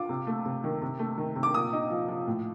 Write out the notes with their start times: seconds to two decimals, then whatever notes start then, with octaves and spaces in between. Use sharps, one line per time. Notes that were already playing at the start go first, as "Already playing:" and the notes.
Already playing: F4 D6
0.09 C3
0.27 A3
0.45 C3
0.64 D#3
0.82 C3
0.99 A3
1.18 D#3
1.36 C3
1.43 D6
1.54 A#2 D#6
1.73 D#4
1.90 F3
2.09 F3
2.27 A2